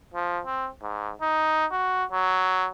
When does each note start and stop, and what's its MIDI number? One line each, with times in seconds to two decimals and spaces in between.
0.14 0.40 53
0.46 0.68 60
0.82 1.12 44
1.22 1.66 63
1.71 2.04 66
2.12 2.68 54